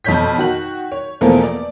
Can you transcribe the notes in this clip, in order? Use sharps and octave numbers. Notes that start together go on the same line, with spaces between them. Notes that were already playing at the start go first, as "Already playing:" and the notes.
F2 B2 C#5 G6 B6
D#3 F#4 F#7
C#5
E2 B2 F3 A3 A#3 A#4
D5